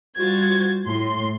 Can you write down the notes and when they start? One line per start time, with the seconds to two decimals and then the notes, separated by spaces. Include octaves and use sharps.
0.18 G3 F4 F#4 C5 G#6 A6
0.86 A2 C6